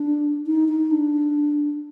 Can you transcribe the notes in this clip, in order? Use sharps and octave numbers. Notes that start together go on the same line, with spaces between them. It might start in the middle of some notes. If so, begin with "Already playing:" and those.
Already playing: D4
D#4
D#4
D4